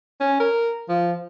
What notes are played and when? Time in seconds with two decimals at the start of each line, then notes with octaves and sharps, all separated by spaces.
0.20 C#4
0.40 A#4
0.89 F3